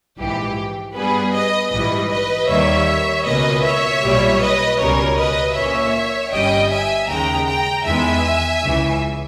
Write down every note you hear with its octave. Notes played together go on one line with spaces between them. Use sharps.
A#1 G#2 E3 G4
G2 G3 B3 G#4 B4
B4 D#5
A#1 G#2 E3 G3 B4 D#5
B4 D#5
D#2 D#3 G3 A#3 C#5 E5
C#2 B2 A#3 C#4 B4 D#5
C#5 E5
B1 A#2 G3
B4 D#5
C#2 B2 G3 C#4 A#4 C#5
B4 D#5
A#1 A#2 A#3 C#4 C#5 E5
G1 G2 G3 C#4 D#5 G5
E5 G#5
D#2 C#3 G#3 G5 A#5
G5 A#5
E2 D#3 G#3 B3 E5 G#5
C#2 C#3 E3